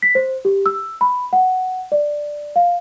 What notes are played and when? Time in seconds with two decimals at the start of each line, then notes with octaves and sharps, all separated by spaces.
0.02 B6
0.15 C5
0.45 G4
0.66 E6
1.01 B5
1.33 F#5
1.92 D5
2.56 F5